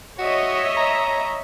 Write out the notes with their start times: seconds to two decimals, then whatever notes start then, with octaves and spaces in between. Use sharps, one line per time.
0.19 F#4 C#5 D#5 E5
0.77 A#5